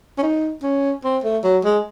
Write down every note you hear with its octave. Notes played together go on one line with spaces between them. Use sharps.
C#4
D#4
C#4
C4
A3
F#3
G#3